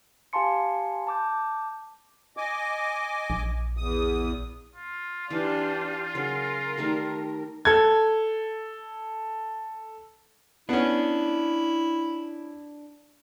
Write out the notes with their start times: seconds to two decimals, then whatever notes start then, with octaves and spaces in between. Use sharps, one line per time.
0.33 G4 F5 G#5 A5 C6 C#7
1.07 A5 D6 G6
2.37 D#5 G#5 D6
3.30 A#1
3.77 E2 D#6
4.75 F4
5.31 E3 D4 G4
6.15 C#3 F#3 A#4
6.77 D#3 G3 A3
7.65 A4 G#6
10.69 B3 C#4 D4 E4